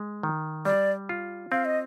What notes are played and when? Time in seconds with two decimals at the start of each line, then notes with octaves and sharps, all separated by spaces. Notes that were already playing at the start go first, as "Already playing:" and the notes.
Already playing: G#3
0.23 D#3
0.65 G3 D5
1.09 F4
1.52 C4 F5
1.65 D#5